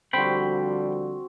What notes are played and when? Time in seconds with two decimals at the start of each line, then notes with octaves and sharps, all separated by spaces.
0.13 D3 F3 G3 C4 F#4 C5 G5 B5